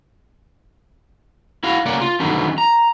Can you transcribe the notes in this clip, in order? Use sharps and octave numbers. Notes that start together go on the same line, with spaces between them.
E4 F#4 F5
C#3 A#3 C#4 D5 F#5
F4
D3 D#3 F#3 G3 B3 C#4
A#5